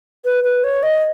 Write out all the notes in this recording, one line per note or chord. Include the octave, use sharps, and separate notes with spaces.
B4
B4
C#5
D#5